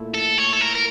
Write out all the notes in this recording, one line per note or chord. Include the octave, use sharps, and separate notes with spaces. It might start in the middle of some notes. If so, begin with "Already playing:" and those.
Already playing: A#2 A3 E4
A4
C#5
A4
A#4
A#4